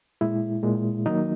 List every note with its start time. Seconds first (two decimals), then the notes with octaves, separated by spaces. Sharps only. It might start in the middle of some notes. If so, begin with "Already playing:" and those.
0.21 A#2 G#3 E4
0.63 A#2 G#3
1.06 D#3 F#3 A#3 D#4